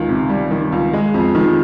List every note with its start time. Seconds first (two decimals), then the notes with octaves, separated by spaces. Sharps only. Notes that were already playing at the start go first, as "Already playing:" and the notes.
Already playing: C#2 D#3
0.09 C3
0.29 G3
0.51 D#3
0.72 C#2
0.93 G#3
1.14 F2
1.35 D#3